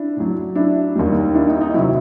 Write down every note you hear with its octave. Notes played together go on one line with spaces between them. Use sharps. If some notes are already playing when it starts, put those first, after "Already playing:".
Already playing: D4 E4
A2 F#3
D4 E4
D#2 D#3 G3
D4 E4
D#4
D#4
C3 D#3 F#3 E4 F#4